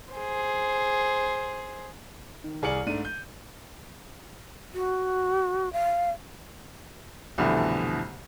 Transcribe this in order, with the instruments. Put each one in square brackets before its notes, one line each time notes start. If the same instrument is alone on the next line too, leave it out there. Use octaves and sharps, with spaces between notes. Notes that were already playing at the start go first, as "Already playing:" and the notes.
[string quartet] G#4 C5
[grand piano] D#3
C2 G#4 D5 F6 C#7 F#7
G#2 A3 D4 D#7
G6
[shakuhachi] F#4
F5
[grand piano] C2 F2 B2 D3 E3 A3